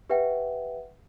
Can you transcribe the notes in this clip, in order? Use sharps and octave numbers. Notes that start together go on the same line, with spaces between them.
G4 B4 E5 F#5 G5